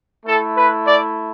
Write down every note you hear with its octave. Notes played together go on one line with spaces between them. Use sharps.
A3 E4 A4
B4
D5